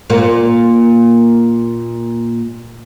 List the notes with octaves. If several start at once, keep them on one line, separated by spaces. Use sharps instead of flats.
A#2 A#3